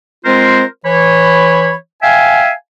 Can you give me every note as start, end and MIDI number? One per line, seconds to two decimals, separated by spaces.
0.24 0.63 56
0.24 0.63 60
0.24 0.63 65
0.24 0.63 70
0.24 0.63 72
0.85 1.74 52
0.85 1.74 73
0.85 1.74 83
2.02 2.51 76
2.02 2.51 77
2.02 2.51 79
2.02 2.51 80